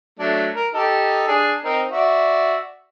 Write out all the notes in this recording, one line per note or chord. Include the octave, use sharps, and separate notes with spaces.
F#3 A3 D4
A#4
D#4 G4 A4
D4 G#4
C4 D#4 A#4
F#4 D5 E5